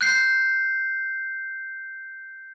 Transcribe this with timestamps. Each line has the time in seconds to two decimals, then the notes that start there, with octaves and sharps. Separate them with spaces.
0.01 F#6 G6 C7